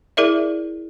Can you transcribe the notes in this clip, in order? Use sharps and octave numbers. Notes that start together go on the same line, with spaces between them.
E4 G#4 A#4 D5 E5